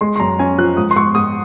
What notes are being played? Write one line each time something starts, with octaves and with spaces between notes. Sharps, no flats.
G#3 C6
C6
F#2 A#5
C#4 G#5
F3 F#6
G#2 D#6
C6
G#2 C#6
G#2 D#6